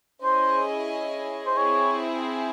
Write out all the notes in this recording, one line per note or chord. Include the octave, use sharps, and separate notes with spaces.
C#4 E4 G#4 C5 D#5 G#5
C5
C4 E4 G#4 C#5